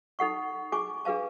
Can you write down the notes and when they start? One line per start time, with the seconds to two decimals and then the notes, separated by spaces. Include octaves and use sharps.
0.19 D#4 A4 F#5 C#6
0.72 G#4 G#5 C#6 D6
1.05 D4 G#4 B4 F5 A5